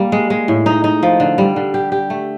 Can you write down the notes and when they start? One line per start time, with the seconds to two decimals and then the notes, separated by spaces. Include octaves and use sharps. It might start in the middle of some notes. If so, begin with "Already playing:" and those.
Already playing: G3 A#3
0.12 G#3
0.30 G#3
0.48 A2
0.66 D#4
0.84 D#4
1.03 F3
1.20 D3
1.38 G3
1.56 D3
1.74 G4
1.92 G4
2.10 A3